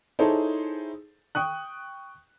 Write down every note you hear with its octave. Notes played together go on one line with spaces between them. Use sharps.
D#4 E4 G#4 A4 C5 C#5
G5 C#6 D#6 F#6